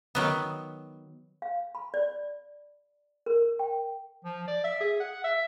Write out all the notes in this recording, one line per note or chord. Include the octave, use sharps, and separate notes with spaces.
D#3 F#3 B3
F5
B5
D5
A#4
G5
F3
D5
E5
G#4
F#5
E5